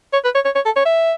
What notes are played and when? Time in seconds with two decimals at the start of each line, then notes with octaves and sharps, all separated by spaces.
0.13 C#5
0.24 B4
0.35 C#5
0.45 C#5
0.56 C#5
0.65 A4
0.76 C#5
0.85 E5